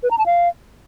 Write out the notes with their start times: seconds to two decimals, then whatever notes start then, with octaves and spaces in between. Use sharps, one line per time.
0.03 B4
0.11 A#5
0.18 A5
0.26 F5